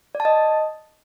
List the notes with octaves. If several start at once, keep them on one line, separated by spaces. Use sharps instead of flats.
D5
A5
D#5